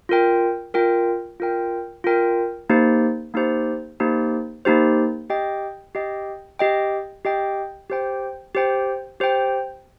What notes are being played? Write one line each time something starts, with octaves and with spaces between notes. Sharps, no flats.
F4 A#4 G5
F4 A#4 G5
F4 A#4 G5
F4 A#4 G5
A#3 D#4 G4 C5
A#3 D#4 G4 C5
A#3 D#4 G4 C5
A#3 D#4 G4 C5
G4 D#5 G5
G4 D#5 G5
G4 D#5 G5
G4 D#5 G5
G4 C5 G5
G4 C5 G5
G4 C5 G5